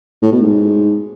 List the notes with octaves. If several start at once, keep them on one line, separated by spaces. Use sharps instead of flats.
A2
B2
G#2